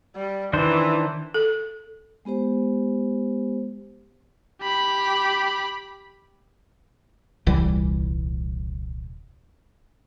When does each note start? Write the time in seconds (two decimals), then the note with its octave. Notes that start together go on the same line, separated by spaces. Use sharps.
0.16 G3
0.53 D#3 E3 D4 C5
1.34 A4
2.25 G#3 B3 G4 C5
4.62 G4 B5
7.46 D#1 C2 E3 G3